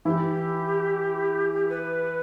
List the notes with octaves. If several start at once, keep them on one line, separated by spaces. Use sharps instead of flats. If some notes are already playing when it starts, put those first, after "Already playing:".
E3 E4 G4
B4